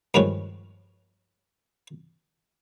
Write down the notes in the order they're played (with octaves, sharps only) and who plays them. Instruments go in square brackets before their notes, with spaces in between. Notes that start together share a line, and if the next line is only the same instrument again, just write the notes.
[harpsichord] G2 D#3 F3 G#3 B4 C#5